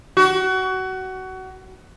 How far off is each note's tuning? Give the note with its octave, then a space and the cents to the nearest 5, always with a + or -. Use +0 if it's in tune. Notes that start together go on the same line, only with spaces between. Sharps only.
F#4 +25